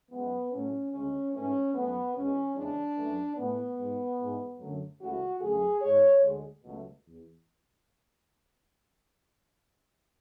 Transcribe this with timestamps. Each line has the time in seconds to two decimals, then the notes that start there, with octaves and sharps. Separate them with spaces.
0.11 F#2 E3 G#3 B3
0.51 A2 F#3 A3 C#4
0.93 D2 C#3 G#3 C#4
1.33 G#2 E3 A3 C#4
1.74 F#2 E3 A3 B3
2.15 E2 B2 G#3 C#4
2.55 E2 C#3 E3 G#3 D4
2.96 F#2 E3 A3
3.37 A2 E3 A3 B3
3.78 G#2 G#3
4.18 G#2 E3 G#3
4.59 F#2 D3 F#3 A3
5.01 C#2 C#3 E3 A3 F#4
5.41 F#2 D3 A3 G#4
5.81 G#2 G#3 C#5
6.23 D2 D3 G#3
6.63 C#2 B2 F#3 A3
7.04 E2